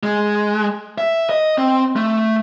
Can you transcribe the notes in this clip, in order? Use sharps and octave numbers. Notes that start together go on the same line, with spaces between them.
G#3
E5
D#5
C4
A3